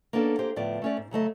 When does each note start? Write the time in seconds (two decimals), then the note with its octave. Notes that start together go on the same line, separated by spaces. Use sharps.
0.13 A#3 B3 C#4 D4 A4
0.39 A#3 G4 G#4 C5
0.56 D2 A2 F3 B3 D5
0.82 A3 C#4 D5
0.97 G#2
1.11 C#3 F#3 A3 D#5